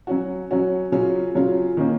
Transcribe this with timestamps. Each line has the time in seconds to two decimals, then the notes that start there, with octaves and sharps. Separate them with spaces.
0.07 F#3 C#4 F#4
0.51 F#3 C#4 F#4
0.92 C#3 F#3 C#4 F4
1.35 C#3 F#3 C#4 F4
1.77 D#3 A#3 C#4